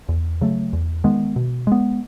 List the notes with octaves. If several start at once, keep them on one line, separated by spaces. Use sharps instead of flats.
E2
C#3 F#3 A3
E2
D#3 G#3 B3
B2
G#3 B3